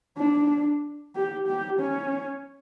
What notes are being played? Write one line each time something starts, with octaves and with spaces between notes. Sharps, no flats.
D4
G4
G4
C#4